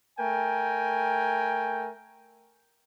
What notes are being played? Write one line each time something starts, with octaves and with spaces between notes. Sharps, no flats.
A3 A#4 G5 G#5